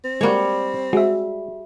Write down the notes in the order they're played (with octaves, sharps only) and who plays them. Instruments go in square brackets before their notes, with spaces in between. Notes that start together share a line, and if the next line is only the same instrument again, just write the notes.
[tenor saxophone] C4
[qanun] G3 C#5 [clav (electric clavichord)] G#3 A#3 F#4
[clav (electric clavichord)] G#3 [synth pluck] F#4 G#4 E5